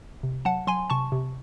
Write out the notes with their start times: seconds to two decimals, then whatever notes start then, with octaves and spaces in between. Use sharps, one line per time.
0.23 C3
0.45 F#3 F#5 A5
0.67 F#3 G#5 C6
0.90 C3 A5 C#6
1.12 C3